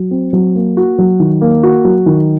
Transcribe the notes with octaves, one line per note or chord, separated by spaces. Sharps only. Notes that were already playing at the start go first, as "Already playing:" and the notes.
Already playing: F#3
C4
F#3
A#3
F#4
F#3
D#3
A#3
F#4
F#3
D#3